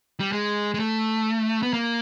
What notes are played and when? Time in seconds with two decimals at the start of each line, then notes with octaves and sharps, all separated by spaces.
0.20 G3
0.32 G#3
0.74 G#3
0.79 A3
1.63 B3
1.73 A#3